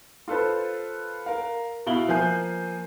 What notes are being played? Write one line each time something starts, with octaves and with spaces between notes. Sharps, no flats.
F4 A4 B4 C5
A#4 F5
B2 E4 F5 F#7 G7
F3 A#3 G#5 G6 C7